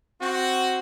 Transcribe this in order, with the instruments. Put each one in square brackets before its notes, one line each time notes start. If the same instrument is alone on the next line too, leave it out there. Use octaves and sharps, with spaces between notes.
[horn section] C4 F#4